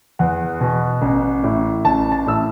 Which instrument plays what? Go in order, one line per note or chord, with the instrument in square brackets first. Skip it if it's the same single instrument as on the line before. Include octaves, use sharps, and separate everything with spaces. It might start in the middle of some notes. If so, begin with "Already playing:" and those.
[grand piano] E2 F#5
B2
A1
A2
A1 A5
A5
A2 E6